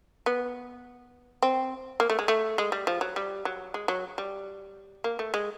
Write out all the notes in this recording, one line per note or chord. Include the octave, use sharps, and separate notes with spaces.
B3
C4
A#3
A3
G#3
A3
G#3
G3
F3
F#3
G3
F#3
G#3
F#3
G3
A#3
A3
G#3